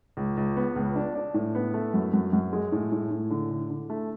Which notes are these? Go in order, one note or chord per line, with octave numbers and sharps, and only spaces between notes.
C#2
C#2
B3
C#2
D4
D4
A2
B3
A3
F#2
F#2
F#2
G#3
A2
A2
A2
D3
D3
D3
A3